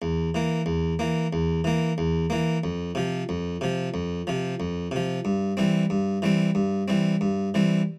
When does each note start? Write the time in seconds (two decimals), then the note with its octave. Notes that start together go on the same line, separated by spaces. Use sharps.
0.02 E2
0.35 E3 A#3
0.66 E2
0.99 E3 A#3
1.33 E2
1.64 E3 A#3
1.98 E2
2.30 E3 A#3
2.64 F2
2.95 C3 F3
3.29 F2
3.61 C3 F3
3.94 F2
4.27 C3 F3
4.60 F2
4.91 C3 F3
5.25 G2
5.57 E3 G3 C4
5.90 G2
6.22 E3 G3 C4
6.55 G2
6.88 E3 G3 C4
7.21 G2
7.54 E3 G3 C4